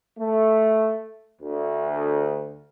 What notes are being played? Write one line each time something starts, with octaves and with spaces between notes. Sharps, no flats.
A3
D2